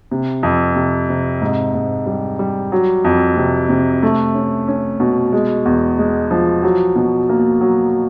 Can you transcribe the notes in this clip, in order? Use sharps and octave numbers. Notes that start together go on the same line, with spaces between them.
C3
F2
C3
C3
G#2
G#2
G3
G3
F#3
F2
C3
C3
A3
C#4
C#4
B2
G#3
E2
G#3
F3
F#3
B2
A#3
F#3